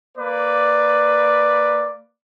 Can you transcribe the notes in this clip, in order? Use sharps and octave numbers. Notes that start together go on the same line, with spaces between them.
A#3 B4 D5